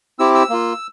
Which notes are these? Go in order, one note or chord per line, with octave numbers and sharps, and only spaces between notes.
C4 E4 G4 E6
E6
A#3 F4